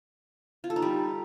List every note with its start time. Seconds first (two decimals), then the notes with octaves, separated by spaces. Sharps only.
0.64 F4
0.70 A4
0.76 D#4
0.82 G3